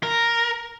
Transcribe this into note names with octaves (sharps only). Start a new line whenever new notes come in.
A#4